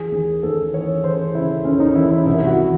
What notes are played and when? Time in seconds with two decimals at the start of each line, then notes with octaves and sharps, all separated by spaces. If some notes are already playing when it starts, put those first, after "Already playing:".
Already playing: E3 G#4
0.12 D#2
0.43 D#2 A4
0.73 E3 C#5
1.04 E3 C5
1.35 C#3 E4
1.65 D#2 C#4
1.80 D#4
1.95 E3 E4
2.11 E4
2.26 C2 E4
2.46 F#4
2.57 E3